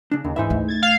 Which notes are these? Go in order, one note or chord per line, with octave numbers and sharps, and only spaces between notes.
C#3 D4
D#2 C#3
G#2 E3 D#4 E4 E5
D2 A3
G#6 A6
F5